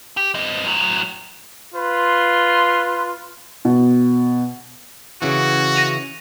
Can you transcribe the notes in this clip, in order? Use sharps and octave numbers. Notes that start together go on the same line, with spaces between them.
G4
G2 D#5
A2 F#3
F4 B4 C6
B2
C#3 E3 F#4
A#6 D#7 F7